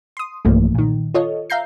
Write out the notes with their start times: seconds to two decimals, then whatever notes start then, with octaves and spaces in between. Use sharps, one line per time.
0.17 C6 D#6
0.45 B1 G2 E3 F3 A3 A#3
0.75 A#2 D#3
1.14 F4 A4 C#5 D#5
1.50 E5 F5 A#5 G6 C7